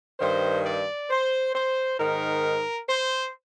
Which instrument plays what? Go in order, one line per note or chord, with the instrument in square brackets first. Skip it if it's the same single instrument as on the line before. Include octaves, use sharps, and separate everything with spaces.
[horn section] G2 D#3 C5
D5
C5
C5
G#2 D#3 A#4
C5